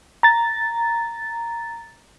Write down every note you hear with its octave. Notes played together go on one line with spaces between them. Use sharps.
A#5 A6